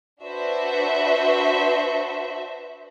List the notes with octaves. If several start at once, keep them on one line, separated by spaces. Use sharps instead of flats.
D4 F#4 B4 C5 E5